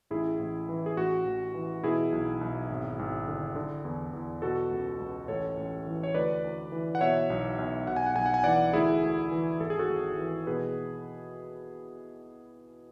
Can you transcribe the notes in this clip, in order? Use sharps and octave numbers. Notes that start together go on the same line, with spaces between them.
A1 E4 G#4
A1
E3
G#4
A1 F#4
A1
E3
B2 E4 G#4
B1
B1
G#1
G#1
D3
D3
E2
E2
B2 F#4 A4
C#2
C#2
A1 A4 C#5
A1
E3
C#5
D2 B4 D5
D2
E3
F#5
B2 C#5 E5
B1
B1
B1 F#5
G#5
F#5
B1 G#5
F#5
G#5
E3 D5 F#5
D2 E4 G#4
D2
E3
G#1 A4
G#4
F#4 A4
G#1
E3
B2 G#4 B4